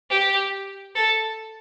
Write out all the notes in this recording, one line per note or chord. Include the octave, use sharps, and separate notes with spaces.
G4
A4